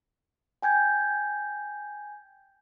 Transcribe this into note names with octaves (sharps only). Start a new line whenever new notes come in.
G5 G#5 G6 G#6